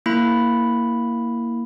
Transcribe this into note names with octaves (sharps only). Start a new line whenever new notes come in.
A#3 E4 B5